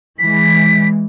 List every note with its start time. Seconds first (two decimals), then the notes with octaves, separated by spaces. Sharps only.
0.18 E3 G#3 B6